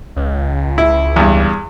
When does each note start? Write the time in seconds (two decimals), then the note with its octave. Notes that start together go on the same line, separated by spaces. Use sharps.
0.16 C#2
0.78 E4
1.16 E2 G2